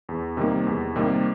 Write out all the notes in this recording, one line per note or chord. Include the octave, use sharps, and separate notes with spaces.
E2
C3 D#3 G3 A#3
E2
C3 D#3 G3 A#3